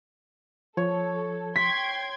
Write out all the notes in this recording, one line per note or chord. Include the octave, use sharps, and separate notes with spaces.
F3 A4 C#5
G5 C6 G#6 B6